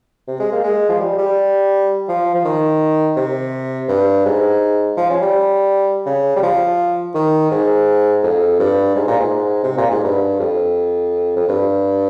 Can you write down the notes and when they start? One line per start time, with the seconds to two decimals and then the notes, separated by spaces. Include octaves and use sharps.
0.28 C3
0.40 G#3
0.52 A#3
0.64 G#3
0.89 F3
1.00 G3
1.18 G3
2.08 F3
2.35 F3
2.45 D#3
3.17 C3
3.89 G2
4.25 G#2
4.97 F3
5.10 C#4
5.21 G3
6.06 C#3
6.36 G3
6.43 F3
7.15 D#3
7.51 G#2
8.23 F2
8.59 G2
8.96 G#2
9.07 A#2
9.20 G#2
9.63 C3
9.77 A#2
9.91 G#2
10.04 G2
10.40 F2
11.37 F2
11.48 G2